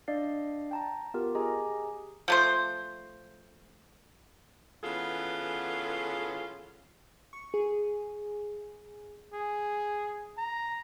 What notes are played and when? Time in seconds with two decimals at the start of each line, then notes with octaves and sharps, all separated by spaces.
0.08 D4 D5 D#5 F5 C7
0.71 G5 A5 A#5
1.14 B3 F4 G4 A#4
1.35 G4 G#4 D#5 G#5 A#5
2.28 F3 A3 C5
4.83 E3 B3 C#4 F4 G#4 A4
7.33 C#6
7.54 G#4
9.33 G#4
10.37 A#5